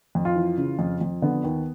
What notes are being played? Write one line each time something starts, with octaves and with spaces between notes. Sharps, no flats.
F2
F4
E3
C#3
F2
F2
D3 B3
D#2